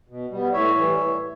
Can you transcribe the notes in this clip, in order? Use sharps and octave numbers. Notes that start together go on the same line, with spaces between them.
B2
G3 B3
A2 C#5 E5
E3 G3
A2